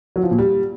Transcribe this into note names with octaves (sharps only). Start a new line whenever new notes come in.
F#3
F3
A#2
G3